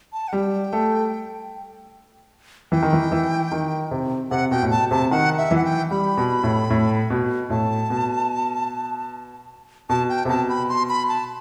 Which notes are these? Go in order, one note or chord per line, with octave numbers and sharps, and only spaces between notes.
A5
F#5
G3 G5
A3
E3 G5
D#3
E3
E3
D#3
C3
C3 F#5
B2 G5
A2
B2 A5
C3 A5
D#3 F#5
E5
E3
F#5
G5
G3 B5
B2
A2
A2
B2
A2 A5
B2
B2 A5
G5
C3
B2 A5
B5
C6
B5
A5